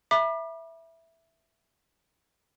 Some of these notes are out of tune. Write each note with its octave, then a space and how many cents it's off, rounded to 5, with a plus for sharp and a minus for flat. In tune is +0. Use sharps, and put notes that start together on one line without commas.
E5 +0 B5 -35 D6 +35